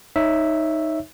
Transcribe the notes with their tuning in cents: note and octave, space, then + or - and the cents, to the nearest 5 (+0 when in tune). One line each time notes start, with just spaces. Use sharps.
D#4 +0 C#5 +0 E5 +0